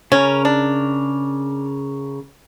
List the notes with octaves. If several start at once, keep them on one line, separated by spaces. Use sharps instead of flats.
C#3 C#4 A#4
D4